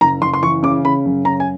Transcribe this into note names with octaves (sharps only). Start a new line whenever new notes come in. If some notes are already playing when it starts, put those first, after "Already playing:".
F#1 A#5
F#1 C6
C6
E3 C#6
C#3 D6
C#3 B5
F#2
C#3 A#5
G#5